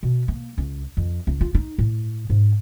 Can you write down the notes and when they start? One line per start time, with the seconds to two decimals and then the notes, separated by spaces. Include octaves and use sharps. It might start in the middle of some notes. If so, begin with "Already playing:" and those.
0.03 B2
0.28 A#3
0.58 C#2
0.97 F2
1.27 C#2
1.41 F4
1.55 D#4
1.78 A2
2.30 G#2